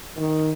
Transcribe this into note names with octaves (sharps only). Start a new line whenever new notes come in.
D#3